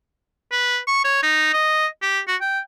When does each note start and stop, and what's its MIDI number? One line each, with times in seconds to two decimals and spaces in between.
0.52 0.78 71
0.87 1.03 85
1.04 1.20 73
1.23 1.48 63
1.53 1.86 75
2.02 2.20 67
2.28 2.36 66
2.41 2.59 79